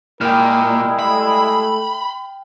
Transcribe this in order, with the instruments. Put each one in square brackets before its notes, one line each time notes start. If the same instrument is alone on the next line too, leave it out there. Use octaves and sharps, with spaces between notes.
[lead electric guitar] A#2 [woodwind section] G3 G#3 E4 [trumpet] A#4 [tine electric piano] G5 F6
[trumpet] A3 [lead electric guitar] B5